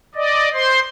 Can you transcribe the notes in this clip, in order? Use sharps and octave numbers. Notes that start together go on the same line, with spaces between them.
D5 D#5
C5 C6